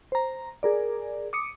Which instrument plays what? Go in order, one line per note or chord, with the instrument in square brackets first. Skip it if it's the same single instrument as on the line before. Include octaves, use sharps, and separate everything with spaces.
[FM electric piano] C5 A#5
G#4 A#4 D5
D6 D#6 C#7